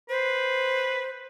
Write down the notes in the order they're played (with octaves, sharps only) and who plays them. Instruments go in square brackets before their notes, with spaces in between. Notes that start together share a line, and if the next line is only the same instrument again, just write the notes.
[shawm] B4 [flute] C5